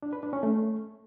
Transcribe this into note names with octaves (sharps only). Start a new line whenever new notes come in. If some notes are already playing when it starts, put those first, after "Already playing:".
D4
B4
D4
C#4
A3